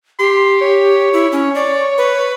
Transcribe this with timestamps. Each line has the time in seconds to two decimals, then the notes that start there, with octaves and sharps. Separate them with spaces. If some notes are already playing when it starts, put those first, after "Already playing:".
0.19 G4 C6
0.62 C#5
1.13 E4
1.32 C#4
1.55 D5
1.98 B4